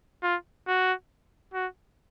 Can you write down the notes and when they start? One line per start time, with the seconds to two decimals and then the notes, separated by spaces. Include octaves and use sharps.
0.23 F4
0.67 F#4
1.54 F#4